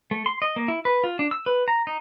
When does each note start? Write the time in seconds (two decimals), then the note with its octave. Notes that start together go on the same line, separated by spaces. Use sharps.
0.11 A3
0.26 C6
0.42 D#5
0.56 A#3
0.68 E4
0.85 B4
1.04 F4
1.19 D4
1.31 E6
1.46 B4
1.68 A#5
1.87 D#4